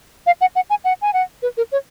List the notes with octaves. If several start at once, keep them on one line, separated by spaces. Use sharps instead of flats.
F5
F#5
F#5
G#5
F#5
G#5
F#5
B4
A#4
C#5